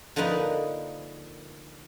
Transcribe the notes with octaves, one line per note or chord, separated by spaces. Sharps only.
D3 F3 A#3 D#4 B4